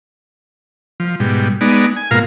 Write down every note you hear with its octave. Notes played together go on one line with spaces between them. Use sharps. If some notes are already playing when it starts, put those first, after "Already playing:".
F3
G#2 B2 G3
G#3 B3 D#4 D5
G#5
G#2 B2 A#3 F4 A#4 F5